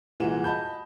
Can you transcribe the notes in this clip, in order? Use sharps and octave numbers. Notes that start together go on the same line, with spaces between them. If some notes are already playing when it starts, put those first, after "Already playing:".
C2 A#2 E3 G#3 F#4 E7
D#5 A5 B5 G6